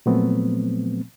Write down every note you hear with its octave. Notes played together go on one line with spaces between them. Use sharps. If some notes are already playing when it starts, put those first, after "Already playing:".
A#2 F3 F#3 A3 B3 C4